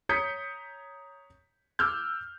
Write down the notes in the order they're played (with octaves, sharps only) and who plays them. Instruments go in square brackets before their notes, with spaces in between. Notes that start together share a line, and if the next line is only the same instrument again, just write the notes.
[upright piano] C#5 A#5 D#6 G6 B6 C#7
D6 E6 F6 G6